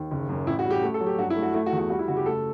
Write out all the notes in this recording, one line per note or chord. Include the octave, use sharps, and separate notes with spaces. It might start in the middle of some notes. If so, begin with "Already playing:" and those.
Already playing: D#2
F#1
F#2
A1 E4
F#4
G3
G4
A3
A4
F#3
G4
G2 F#4
E4
A3
F#4
A3 E4
F#4
E2
F#4
G3 F#4
E4
F#1 F#4
G4
A3 A4